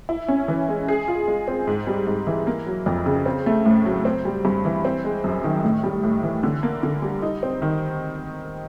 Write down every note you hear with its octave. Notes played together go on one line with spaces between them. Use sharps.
E4
C#4
E3
G#3
G#4
F4
G#3
C4
G#2
G3
G#2
E3
A#3
F#3
F2
C#3
C4
A3
A2
F#3
C4
G3
G2
E3
C4
G#3
F#2
D#3
A2
G3
A2
E3
D3
A#3
D3
G3
D#4
C4
D#3